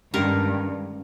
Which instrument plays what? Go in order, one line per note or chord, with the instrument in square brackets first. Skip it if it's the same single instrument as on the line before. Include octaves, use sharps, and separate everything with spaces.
[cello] G2 [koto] D3 D#3 A#4 [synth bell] G#3 C#4